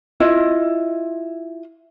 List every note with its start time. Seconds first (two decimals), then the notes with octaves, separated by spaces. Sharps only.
0.20 E4 F4 D#5